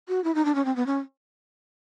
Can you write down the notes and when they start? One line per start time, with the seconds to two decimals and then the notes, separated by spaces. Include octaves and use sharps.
0.08 F#4
0.24 E4
0.35 D#4
0.45 D4
0.55 C#4
0.65 C4
0.76 B3
0.86 C#4